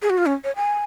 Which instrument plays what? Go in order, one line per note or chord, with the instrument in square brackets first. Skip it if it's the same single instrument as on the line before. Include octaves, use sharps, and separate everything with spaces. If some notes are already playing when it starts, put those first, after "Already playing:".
[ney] G#4
F#4
F4
C#4
C#5
G#5